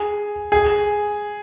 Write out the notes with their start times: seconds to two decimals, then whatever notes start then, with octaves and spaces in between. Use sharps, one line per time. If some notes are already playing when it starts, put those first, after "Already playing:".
Already playing: G#4
0.52 G#4